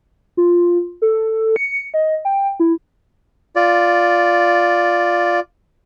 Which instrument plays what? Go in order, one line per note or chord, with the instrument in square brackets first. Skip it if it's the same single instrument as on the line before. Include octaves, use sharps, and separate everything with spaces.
[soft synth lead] F4
A4
C#7
D#5
G5
E4
[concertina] F4 D5